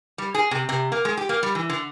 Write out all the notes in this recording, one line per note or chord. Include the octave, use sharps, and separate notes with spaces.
G3
G#4
C3
C3
A#3
G#3
G4
A#3
G3
E3
D3